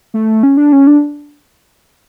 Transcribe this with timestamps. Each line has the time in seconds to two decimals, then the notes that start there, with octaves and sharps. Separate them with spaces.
0.14 A3
0.43 C#4
0.57 D4
0.72 C#4
0.87 D4